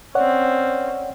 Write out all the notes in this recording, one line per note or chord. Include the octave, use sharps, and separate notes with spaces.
C4 C#4 C#5 D5 F#5